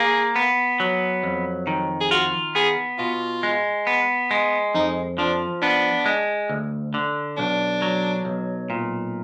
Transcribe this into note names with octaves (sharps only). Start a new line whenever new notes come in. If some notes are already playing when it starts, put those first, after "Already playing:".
Already playing: A#3 G#4
B3
F#3
F2
D#3
G#4
F4 F#4
B3 G#4
B2 F4
G#3
B3
G#3
F2 D#4
F3 D4
B3 D4
G#3
D2
D3
B1 D4
F#3
B1
A#2